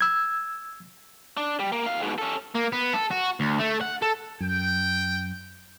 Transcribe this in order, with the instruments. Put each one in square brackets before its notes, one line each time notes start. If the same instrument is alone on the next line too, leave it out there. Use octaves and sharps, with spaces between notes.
[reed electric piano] E6 G#6
[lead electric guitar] D4
G3
A#3
D#2 F5
G#2 B2
C#4 A4
[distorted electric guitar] A#3
B3
A4
F#4
D2
A3
F#5
A4
[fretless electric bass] F#2 [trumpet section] G5